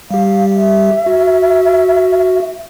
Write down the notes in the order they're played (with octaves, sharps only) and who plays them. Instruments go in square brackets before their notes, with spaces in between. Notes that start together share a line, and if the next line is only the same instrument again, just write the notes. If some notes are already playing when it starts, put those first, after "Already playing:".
[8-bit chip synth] G3 G4 [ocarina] F5
[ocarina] E5
[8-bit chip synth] F#4